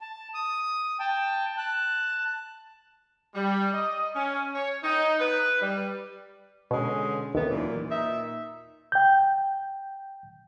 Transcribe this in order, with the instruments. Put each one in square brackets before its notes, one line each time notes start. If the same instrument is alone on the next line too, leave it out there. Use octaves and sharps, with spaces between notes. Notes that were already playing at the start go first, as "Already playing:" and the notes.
[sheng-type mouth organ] A5
D#6
G5 A5
A5 F#6
[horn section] G3
D#5
C#4
C#5
D#4
B4
G3
[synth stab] B2 [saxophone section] D3 G#3 C#4
[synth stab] D#2 [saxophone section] C3 A3 B3
[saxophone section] F#2 A#2 E3
A#2 D#4 E5
[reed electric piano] G5 G6